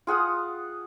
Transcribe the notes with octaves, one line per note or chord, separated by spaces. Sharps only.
F4 G#4 F#5 D#6